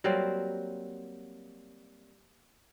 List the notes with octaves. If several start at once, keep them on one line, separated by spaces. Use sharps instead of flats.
F#3 G3 A#3 C4